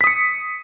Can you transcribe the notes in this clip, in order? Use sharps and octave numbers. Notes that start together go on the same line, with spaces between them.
D#6 B6 C#7